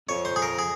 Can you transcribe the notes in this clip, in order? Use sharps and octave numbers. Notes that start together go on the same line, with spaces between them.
F2 C#5
C5
G#4
A#4
G#4